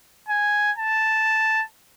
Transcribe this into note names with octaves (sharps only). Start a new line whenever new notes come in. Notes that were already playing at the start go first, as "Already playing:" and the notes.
G#5
A5